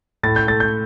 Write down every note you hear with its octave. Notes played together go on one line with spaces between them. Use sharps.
A2 A6
G6
A3 A6
G6